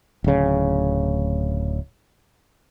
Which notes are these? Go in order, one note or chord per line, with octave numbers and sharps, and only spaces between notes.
D1 C#3